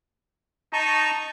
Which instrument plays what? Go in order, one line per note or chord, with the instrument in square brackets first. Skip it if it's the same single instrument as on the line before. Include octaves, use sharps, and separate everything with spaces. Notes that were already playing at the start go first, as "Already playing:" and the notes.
[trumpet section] D#4 [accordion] A5 A#5 C#6